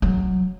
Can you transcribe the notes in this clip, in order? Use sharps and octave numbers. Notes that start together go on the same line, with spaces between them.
F#3